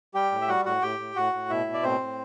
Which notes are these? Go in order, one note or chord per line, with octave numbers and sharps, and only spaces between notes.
G3 G4 G5
A2
E5
G3 F#4 F#5
A2 F#4 F#5
A2 G4 G5
A2
A2 F#4 F#5
A2
B2 E4 E5
B2
D5
A2 C4 C5
A2